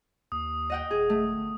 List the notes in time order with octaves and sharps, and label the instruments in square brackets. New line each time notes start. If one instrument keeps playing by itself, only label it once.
[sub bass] D#2 [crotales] D#6
[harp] D#5 F#5 G5
[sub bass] D#1 [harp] G#4
[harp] A3
[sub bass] G1